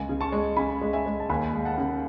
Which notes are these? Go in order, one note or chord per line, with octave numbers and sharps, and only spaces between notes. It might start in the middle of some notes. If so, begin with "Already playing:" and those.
Already playing: C#2 G#5
C#3
A5 C#6
G#3
C#3 G#5 B5
G#3
E5 G#5
G#3
A5
D#2 G#5 B5
G#3
F#5 A5
C#3